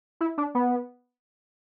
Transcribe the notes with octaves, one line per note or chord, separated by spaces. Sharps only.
E4
D4
B3